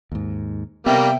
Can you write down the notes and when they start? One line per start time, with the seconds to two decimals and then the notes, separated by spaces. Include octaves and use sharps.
0.12 D#2 G#2
0.86 C3 G3 A#3 B3 E5 G5